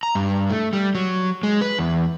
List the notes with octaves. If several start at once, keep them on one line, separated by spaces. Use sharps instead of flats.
A#5
G2
A3
G3
F#3
G#3
B4
E2